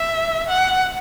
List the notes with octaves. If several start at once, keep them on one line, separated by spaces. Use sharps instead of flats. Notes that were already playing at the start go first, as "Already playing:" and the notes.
Already playing: E5
F#5